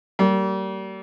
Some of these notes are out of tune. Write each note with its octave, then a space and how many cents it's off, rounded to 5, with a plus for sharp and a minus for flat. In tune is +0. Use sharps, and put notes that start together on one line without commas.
G3 -35 A#3 -25